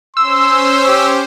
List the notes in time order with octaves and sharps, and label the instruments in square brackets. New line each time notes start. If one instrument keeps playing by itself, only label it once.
[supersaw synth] C#4 C5 [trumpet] C6 [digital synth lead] E6
[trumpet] G4